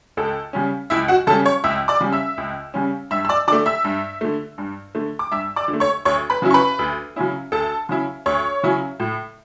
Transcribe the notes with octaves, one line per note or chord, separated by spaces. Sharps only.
C#2 A4
C#3 G3 C#4
C#2 E4 E5
F#4 F#5
C#3 G3 C#4 A4 A5
C#5 C#6
C#2 E5 E6
D5 D6
C#3 G3 C#4
E5 E6
C#2
C#3 G3 C#4
G2 E5 E6
E6
D5 D6
D3 A3 D5 D6
E5 E6
G2
D3 A3
G2
D3 A3
D6
G2 E5 E6
D5 D6
D3
A3
C#5 C#6
D2 C#5 C#6
B4 B5
C#3 F#3 C#4 E4
C#6
B4 B5
D2
C#3 F#3 C#4 E4
D2 A4 A5
C#3 F#3 C#4 E4
D2 C#5 C#6
C#3 F#3 C#4 E4
A2